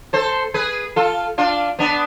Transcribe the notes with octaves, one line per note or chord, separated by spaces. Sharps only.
A4 C5
G#4 B4
F4 A4
D4 F4
B3 D4